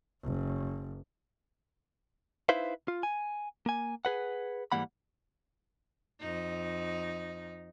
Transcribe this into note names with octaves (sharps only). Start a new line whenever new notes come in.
F#1
D#4 E4 B4 C5 E5 F5
F4
G#5
A#3 G#5
G#4 B4 F#5
G#2 E3 G3 A#3 F#5 B5
F2 D#4